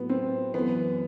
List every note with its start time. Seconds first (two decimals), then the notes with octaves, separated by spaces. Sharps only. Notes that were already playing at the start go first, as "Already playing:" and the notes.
Already playing: A2 F#3 B3
0.10 C4
0.54 F#2 E3 B3